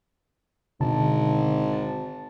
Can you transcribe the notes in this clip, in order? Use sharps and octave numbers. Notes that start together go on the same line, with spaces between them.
G#1 B2 D3 A5
A5